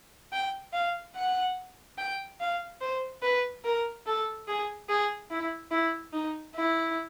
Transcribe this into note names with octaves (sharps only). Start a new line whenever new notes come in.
G5
F5
F#5
G5
F5
C5
B4
A#4
A4
G#4
G#4
E4
E4
D#4
E4